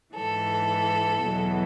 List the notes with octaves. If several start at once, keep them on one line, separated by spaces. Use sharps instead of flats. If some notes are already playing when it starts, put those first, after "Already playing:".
G#2 E3 A4
E2 B2 F#3